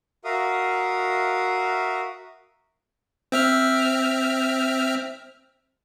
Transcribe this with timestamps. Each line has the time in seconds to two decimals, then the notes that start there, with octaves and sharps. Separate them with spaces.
0.25 F#4 A#4 E5 F5 D#6
3.32 C4 E5 F6